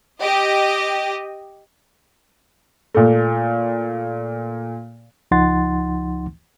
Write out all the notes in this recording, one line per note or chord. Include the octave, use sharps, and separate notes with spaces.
G4 D#5
A#2 A3
C#2 F3 D#4 F#5 C6 A6